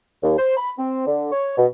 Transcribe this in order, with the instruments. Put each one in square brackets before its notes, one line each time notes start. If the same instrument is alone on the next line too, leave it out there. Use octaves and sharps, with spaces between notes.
[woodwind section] D#2
C5
B5
C4
D3
C#5
B2